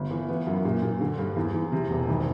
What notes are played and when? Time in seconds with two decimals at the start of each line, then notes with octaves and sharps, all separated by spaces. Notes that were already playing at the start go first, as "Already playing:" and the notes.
Already playing: G1
0.11 E3
0.28 B3
0.47 F#2
0.65 A#2
0.82 A#2
1.01 D3
1.18 G2
1.36 E2
1.54 E2
1.72 C3
1.90 E1
2.08 G#1